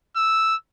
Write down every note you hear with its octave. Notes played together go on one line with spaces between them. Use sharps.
E6